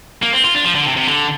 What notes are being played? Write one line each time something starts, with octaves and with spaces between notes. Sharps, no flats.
A#3
C4
F4
D4
F3
D3
C3
C3
D3